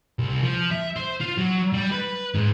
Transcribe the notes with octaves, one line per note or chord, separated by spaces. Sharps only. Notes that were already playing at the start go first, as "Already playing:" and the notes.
C2
F3
E5
C5
F4
F#3
G3
B4
G#2